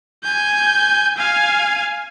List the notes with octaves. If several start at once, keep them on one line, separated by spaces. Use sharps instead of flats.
G#5 G6
F5 G#5